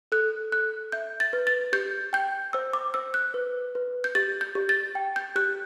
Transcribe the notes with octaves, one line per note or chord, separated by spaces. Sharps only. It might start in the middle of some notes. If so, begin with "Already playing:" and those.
A4 F#6
A4 F#6
E5 G6
A6
B4
A6
G4 G6
G5 G6
C5 E6
D6
C5 E6
F#6
B4
B4
G6
G4 A6
G6
G4
A6
G5
G6
G4 F#6